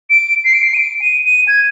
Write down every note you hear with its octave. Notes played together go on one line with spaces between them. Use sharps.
D7
C7
D7
C7
D#7
D7
D#7
D#7
G#6